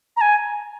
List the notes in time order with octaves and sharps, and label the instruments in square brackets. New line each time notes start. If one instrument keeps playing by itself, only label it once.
[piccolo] A#5
G#5